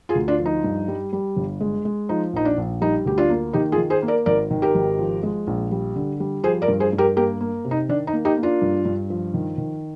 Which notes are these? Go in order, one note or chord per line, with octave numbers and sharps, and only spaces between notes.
F4 G#4
D2
D4 F4
F3
D#4
G2
G3
G3
G1
G#3
G#3
F3 D#4
A#1 D#4
D4
A#1
G3 D#4
D2 G4
D4 F4
A#3
D#3 D#4 G4
F4 G#4
D#3
G#4 C5
A#3
A#4 D5
G#1 A#4 D5
D#3
G4 A#4
G#1
F3
G#3
A#1
G3
D3
G3
F3 G#4 C5
A#4 D5
G2
G#4 C5
G2
G4 A#4
A#3 G4 A#4
A#3
C3
D#4
D#3 D4
D#4
A#3
D#4 G4
A#3
D4 F4
G2
G2
F3
D#3
D#3